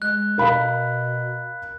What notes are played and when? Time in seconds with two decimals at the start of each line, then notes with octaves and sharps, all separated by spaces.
0.02 G#3 F#6
0.38 B2 A#4 F5 B5